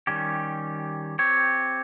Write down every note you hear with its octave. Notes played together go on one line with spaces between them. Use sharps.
D#3 G3 C#4 G4
C4 G4 C#5